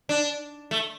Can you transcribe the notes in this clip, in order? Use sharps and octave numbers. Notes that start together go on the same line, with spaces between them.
D4
A3